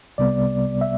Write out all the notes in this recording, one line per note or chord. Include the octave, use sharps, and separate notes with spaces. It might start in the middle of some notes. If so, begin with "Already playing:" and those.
C2 C3 G3 B3 D5
E5